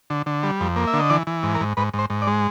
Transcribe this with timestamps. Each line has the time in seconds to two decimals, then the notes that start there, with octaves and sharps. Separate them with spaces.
0.10 D3
0.26 D3
0.43 G3
0.60 F2
0.76 A#3
0.87 E5
0.93 D3
0.99 D#5
1.10 E3 D5
1.27 E3
1.43 G#2
1.55 A#4
1.61 G#2
1.77 G#2 B4
1.94 G#2
1.99 C5
2.10 G#2
2.22 D5
2.27 G#3